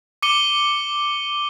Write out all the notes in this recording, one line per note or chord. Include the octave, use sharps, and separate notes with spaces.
D6 C#7 D#7 G7